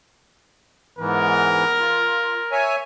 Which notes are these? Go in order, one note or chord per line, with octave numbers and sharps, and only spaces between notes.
G#2 E3 B3 A#4
F4
C#5 E5 G#5